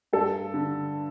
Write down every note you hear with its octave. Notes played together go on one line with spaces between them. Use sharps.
G2 A4
D3